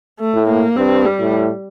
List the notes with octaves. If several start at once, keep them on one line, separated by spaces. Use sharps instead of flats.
A3
A2
A#3
G2 C4
G3
A2